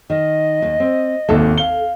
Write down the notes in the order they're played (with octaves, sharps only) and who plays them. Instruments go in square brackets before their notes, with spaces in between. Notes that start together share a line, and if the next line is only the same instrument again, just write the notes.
[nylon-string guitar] D#3 [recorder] D#5
[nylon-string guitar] D#2
C4
[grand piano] G#1 D#2 [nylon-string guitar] A4 E5 A5
[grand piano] F5 G7